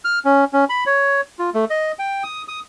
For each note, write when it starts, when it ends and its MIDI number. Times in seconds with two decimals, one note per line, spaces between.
0.05 0.19 89
0.25 0.45 61
0.53 0.65 61
0.69 0.84 83
0.86 1.21 73
1.39 1.50 65
1.54 1.65 57
1.70 1.92 75
1.99 2.23 79
2.24 2.42 87
2.48 2.60 87